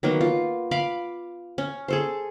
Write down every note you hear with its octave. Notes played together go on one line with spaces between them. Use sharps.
D#3 F#3 A#3 B3
F4
F5 B5 D6
C#4
G#4 A4 C5